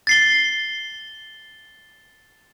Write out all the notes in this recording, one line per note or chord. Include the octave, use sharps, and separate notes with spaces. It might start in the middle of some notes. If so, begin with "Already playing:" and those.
A6 C7 G7